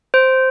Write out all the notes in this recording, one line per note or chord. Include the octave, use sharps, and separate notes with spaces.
C5